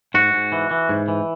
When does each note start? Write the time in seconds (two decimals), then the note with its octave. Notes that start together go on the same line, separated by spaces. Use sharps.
0.14 G#2 F#4
0.33 G#2
0.52 E3
0.71 E3
0.89 G#2
1.08 E3